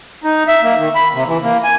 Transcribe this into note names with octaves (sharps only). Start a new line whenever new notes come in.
D#4
E5
A#3
D#3
B5
C3
E3
A#3
G#5